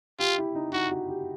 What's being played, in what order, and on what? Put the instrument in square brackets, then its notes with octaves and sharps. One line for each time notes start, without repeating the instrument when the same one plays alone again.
[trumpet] F4 [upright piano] G4
[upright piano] E4
D#4
[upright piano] D#4 [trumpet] F#4
[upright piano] F#4
G4